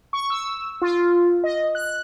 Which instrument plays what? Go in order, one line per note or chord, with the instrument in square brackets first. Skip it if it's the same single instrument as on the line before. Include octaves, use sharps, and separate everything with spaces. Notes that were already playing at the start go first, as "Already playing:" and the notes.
[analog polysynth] C#6
E6
F4
D#5
F#6